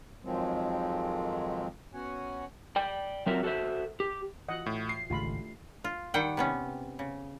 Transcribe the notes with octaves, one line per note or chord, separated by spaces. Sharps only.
F2 D#3 F3 F#3 G#3 C4
B3 C#4 F#4 C#5 F#5 G#5
D5 G5
F#3 C4 F4 F#4 A#4 E5
F#4 A4 A#4 C5 E5
G4
E3 F4 F#4 D#5 F#5
A2
C7
G#1 C#2 A3 D4 F4 G4 B5
F4
D#3 G3 F#5 G5
C3 B3 C#4
C#3